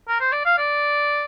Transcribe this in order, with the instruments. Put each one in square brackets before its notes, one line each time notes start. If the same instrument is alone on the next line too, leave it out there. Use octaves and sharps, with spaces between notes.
[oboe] A#4
C5
D5
F5
D5